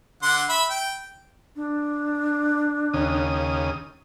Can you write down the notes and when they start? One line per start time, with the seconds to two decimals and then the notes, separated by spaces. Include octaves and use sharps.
0.23 D3 F#5 C6
0.49 E5 B5
0.70 G5
1.56 D4
2.93 D#2 C#3 D#6